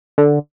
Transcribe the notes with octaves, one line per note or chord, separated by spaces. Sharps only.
D3